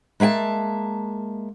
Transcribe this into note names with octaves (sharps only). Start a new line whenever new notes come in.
G#3 A#3 E5 G5 A5